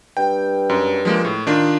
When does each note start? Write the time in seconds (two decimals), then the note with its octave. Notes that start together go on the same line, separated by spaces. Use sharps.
0.17 G2 G5
0.69 F#2
1.05 F3 G#3 A#3
1.25 A2
1.47 D#3 D4 F4